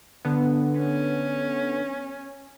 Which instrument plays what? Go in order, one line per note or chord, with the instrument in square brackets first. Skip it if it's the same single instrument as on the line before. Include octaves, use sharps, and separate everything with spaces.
[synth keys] D3 B3
[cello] C#4